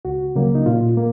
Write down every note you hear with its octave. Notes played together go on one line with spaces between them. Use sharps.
C#2 F#4
C#3 F#3 A#3
D#4
A#2 F4
A#3